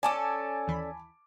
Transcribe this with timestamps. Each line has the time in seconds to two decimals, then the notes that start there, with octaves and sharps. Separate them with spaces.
0.03 C#4 A4 D5 G#5 A5 D6
0.68 D#2 E3 B5